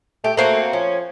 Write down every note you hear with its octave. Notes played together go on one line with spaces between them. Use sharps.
A3 G4
A3 A#3 C4 F#4
F3 C#4